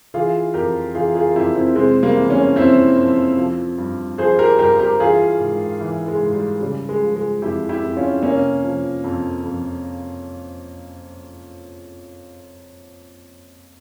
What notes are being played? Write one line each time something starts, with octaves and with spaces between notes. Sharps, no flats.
E3 F4 G#4
F2 G4 A#4
E3 F4 G#4
F4 G#4
F2 E4 G4
C4 E4
C3 G#3 C4
G3 A#3
E3
A#3 C#4
F2 C4 E4
F2
F3
G2
F3 G#4 C5
G4 A#4
G2 G4 A#4
G4 A#4
E3 F4 G#4
G#2
E3
G#3
G#2
G3
C#3 G3
G#3
F3
G#3
F2 E4 G4
E4 G4
F2
C#4 F4
C3 A#3 C#4
F3
F2
F2